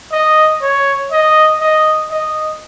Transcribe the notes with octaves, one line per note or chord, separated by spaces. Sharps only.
D#5
C#5
D#5
D#5
D#5